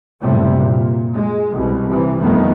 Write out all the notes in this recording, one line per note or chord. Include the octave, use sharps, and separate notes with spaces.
F#1 A2 C3 G3
A#2
G#3
C2 B2
C3 E3
G1 F2 D#3 A3 B3